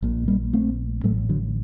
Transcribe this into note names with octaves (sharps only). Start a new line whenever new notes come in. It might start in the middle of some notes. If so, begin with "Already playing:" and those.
A#1 A#2
G3 A#3
A3 C4
A1 A2 F#3 A3
D3 F#3